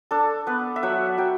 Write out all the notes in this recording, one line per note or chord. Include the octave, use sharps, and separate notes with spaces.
D4 A4
B3 B4
E5
F#3 F#5
F#3 G5